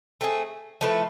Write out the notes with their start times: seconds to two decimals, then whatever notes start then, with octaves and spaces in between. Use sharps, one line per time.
0.21 A3 C4 F4 G#4
0.81 F3 A3 E4 B4